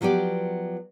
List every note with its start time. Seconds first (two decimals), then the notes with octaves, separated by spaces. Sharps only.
0.01 F3 F#3 B3 G4 D5